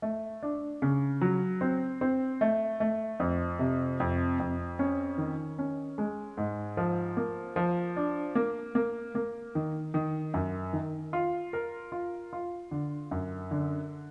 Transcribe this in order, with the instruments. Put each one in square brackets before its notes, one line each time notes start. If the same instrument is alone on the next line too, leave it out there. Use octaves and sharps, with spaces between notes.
[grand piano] A3
D4
C#3
F#3
C4
C4
A3
A3
F2
C3
F2
F2
C#4
D#3
C#4
G#3
G#2
F3
A#3
F3
D4
A#3
A#3
A#3
D#3
D#3
F#2
D#3
F4
A#4
F4
F4
D3
F#2
D3